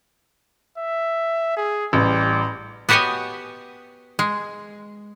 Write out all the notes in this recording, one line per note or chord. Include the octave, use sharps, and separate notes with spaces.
E5
G#4
A1 G3
B3 F#4 G4 C#5 D#5 G#5
G#3